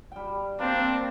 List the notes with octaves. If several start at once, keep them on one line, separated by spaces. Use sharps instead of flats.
G3 G5
A#3 C4 D4